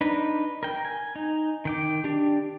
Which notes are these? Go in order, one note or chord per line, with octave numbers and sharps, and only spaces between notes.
D4 D#4 B4
A#4 G5
G#5
D#4
D#3 G5 D6
D4 G4